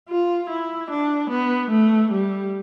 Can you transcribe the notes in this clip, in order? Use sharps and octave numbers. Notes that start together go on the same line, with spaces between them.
F4
E4
D4
B3
A3
G3